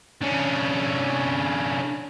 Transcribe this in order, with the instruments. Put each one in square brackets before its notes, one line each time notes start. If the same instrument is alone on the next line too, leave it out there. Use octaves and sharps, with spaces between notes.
[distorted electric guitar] D3 C#4